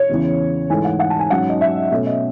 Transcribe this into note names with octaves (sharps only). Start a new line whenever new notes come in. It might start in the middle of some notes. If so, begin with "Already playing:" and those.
Already playing: C#5
E2 C#3 E3
G#2 E3 A3 G#5
F#5
F#5
A5
G#5
G#2 F#3 C#4 F#5
D#5
E5
B2 A3 C#4 E5
D#5